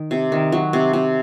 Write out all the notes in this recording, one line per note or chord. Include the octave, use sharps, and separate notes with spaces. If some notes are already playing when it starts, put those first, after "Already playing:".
Already playing: D#3
C3
D#3
F#3
C3
C3